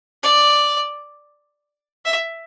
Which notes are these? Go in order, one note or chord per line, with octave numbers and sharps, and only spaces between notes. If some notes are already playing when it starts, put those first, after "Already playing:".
D5
E5